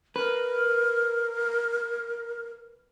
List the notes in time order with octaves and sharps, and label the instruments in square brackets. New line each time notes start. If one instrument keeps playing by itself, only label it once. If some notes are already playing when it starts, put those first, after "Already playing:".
[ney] A#4 [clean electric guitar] B4